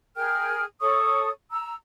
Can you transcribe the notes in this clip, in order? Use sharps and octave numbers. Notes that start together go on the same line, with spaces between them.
G#4 A#4 G5 F6
A4 C#5 C#6 D#6
A#5 E6